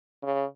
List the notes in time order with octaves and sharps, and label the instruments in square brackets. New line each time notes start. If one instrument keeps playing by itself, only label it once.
[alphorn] C#3